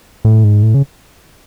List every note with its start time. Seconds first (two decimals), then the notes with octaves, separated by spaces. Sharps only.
0.25 A2
0.44 G#2
0.63 A2
0.74 C#3